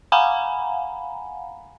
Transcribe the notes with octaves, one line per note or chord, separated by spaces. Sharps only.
F5 F#5 G#5 A#5 B5